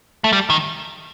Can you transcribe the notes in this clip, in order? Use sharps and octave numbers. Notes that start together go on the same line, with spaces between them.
A3
G3
D#3